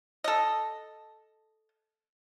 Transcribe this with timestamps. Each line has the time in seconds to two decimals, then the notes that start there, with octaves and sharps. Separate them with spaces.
0.24 A4 D#5